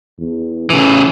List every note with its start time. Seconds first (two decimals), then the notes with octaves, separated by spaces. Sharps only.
0.19 E2
0.70 A1 C#3 E3